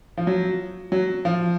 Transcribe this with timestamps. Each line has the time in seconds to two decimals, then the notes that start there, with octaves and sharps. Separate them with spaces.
0.17 F3
0.27 F#3
0.92 F#3
1.25 F3